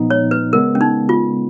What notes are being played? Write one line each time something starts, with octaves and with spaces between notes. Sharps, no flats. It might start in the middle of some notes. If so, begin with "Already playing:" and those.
Already playing: A#2 F3 B3 D#4
C#5
B4
C#3 G#3 B3 A#4
C#4
D#4
F4